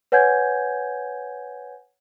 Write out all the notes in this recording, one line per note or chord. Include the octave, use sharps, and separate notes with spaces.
B4 C#5 F#5 G#5 G6 G#6